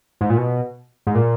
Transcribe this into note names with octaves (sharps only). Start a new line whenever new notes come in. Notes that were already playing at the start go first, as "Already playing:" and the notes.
G#2
A#2
B2
G#2
A#2